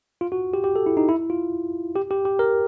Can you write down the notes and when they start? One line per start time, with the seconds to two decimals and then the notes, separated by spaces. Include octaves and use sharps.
0.21 F4
0.32 F#4
0.54 G4
0.64 G4
0.76 A4
0.86 E4
0.97 D#4
1.08 E4
1.30 F4
1.96 G4
2.11 G4
2.25 G4
2.39 A#4